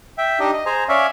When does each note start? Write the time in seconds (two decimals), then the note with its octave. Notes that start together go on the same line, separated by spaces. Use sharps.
0.18 E5 G5
0.39 D4 D#4 G4 D#5
0.53 D#5
0.66 G#4 C5 G#5 A#5
0.89 C#4 C#5 D5 E5 F5